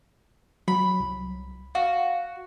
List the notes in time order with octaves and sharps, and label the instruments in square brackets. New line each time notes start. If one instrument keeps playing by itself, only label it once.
[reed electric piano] F#3 [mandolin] B5
[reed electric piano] C2
[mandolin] F#4 [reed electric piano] F5